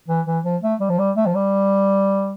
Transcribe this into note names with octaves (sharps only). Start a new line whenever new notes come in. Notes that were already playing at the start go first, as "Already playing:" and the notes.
E3
E3
F3
A3
G3
F3
G3
A3
F3
G3